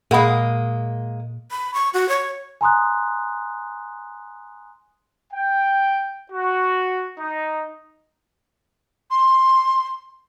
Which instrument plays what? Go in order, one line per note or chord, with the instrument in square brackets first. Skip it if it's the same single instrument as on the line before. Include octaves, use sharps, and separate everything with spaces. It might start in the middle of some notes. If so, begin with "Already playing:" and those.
[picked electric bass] A#2 [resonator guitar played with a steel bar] G#3 A#3 [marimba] G#4 F#5 B5
[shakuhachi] B5
C#6
F#4
C#5
[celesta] G#5 A#5 C6 D#6 F#6
[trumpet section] G5
F#4
D#4
[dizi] C6